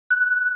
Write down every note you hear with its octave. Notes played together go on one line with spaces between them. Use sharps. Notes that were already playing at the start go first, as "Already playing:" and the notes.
F#6